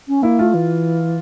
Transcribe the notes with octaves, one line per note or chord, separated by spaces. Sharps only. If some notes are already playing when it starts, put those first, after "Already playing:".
C#4
A#3 E4
A3 F4
E3